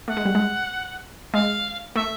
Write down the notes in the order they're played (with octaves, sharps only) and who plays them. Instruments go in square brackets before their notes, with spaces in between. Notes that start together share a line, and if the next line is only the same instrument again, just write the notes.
[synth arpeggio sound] A3 [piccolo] F#5
[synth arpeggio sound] G#3
G3
G#3
[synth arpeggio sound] G#3 [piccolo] F5
[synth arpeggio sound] A3 [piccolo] E5